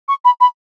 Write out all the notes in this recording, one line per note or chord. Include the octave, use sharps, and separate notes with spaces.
C#6
B5
B5